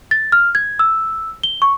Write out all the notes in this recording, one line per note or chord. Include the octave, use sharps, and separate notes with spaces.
A6
F6
G#6
E6
G7
C#6